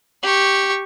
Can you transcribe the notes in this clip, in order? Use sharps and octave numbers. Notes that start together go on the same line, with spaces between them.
G4 C#6